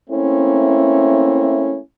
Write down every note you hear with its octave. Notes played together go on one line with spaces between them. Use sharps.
A3 A#3 C4 C#4 E4